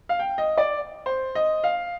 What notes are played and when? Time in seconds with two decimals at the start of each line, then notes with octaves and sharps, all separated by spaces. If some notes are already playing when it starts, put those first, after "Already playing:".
0.09 F5
0.19 G5
0.38 D#5
0.58 D5
1.06 C5
1.35 D#5
1.64 F5